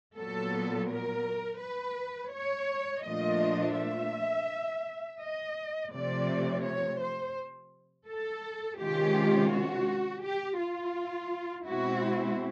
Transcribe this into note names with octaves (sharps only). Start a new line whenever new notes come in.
A#2 F#3 B3 A4
A#4
B4
C#5
A#2 F3 A3 D4 F4 D#5
E5
D#5
C3 F3 A3 D5
C#5
C5
A4
C3 D#3 G#3 C#4 F4 G4
F#4
G4
F4
B2 G#3 C4 E4 F#4